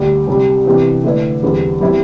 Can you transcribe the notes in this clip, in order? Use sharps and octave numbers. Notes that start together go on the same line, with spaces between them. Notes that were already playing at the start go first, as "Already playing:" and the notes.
Already playing: D2 D3 G3 D4 G4
C2 C3 G3
C3 E3 B3 D4 G4
D3 A3 E4 B4 D5
E2 D3 G3 C4
B2 G3 C4 E4